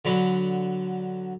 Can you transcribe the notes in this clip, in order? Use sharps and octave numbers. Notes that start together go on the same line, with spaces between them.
D3 F#3 B5